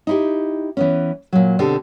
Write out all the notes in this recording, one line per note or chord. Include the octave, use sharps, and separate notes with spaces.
D#4 E4 G4
E3 B3 C#4
A#2 F#3
B2 D3 C4 G4 A4